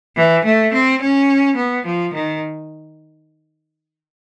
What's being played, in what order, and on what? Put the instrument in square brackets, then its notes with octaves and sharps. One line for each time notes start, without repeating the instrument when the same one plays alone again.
[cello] E3
A3
C4
C#4
B3
F3
D#3